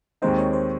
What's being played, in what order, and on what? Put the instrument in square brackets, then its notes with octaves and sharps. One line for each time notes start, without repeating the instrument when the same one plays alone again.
[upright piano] D#2 D#3 G#3 C4 D#4 [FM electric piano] C5
[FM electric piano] C#5
C5